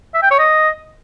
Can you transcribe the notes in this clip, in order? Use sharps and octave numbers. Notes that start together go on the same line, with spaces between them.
E5
G5
C#5
D#5